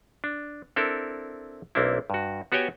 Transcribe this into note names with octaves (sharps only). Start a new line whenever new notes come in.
D4
C4 D4 E4 A4 A#4
B1 A#3 C4 D4 E4
G2 F#4
B3 F#4 G4 C#5 G5 G#5